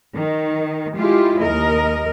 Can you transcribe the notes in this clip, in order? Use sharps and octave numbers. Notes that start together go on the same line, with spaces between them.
D#3
G#3 E4 F4 G4
D#2 A#4 D#5